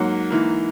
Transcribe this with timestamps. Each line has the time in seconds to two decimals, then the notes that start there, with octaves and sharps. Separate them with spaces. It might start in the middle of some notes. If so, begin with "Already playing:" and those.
Already playing: G#2 F#3 A#3 F#5
0.31 G#2 E3 A#3